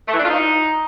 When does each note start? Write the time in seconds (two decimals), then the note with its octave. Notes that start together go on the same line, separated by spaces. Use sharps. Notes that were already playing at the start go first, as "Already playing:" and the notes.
0.08 A3
0.13 E3
0.19 D4
0.24 F4
0.29 D#4